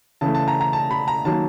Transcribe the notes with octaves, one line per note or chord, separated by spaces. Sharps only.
C#3 E3 A3 A5
A5
A#5
A#5
A5
B5
A#5
D#3 F#3 A#3 A5